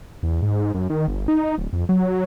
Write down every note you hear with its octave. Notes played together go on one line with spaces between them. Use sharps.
E2
G#2
F#2
D#3
G1
D#4
D1
F2
F#3